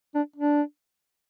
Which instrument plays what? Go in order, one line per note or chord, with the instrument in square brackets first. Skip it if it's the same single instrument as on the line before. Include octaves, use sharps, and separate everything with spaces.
[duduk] D4
D4